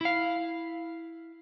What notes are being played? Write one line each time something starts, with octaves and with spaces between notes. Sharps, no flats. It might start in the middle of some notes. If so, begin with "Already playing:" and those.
E4 F5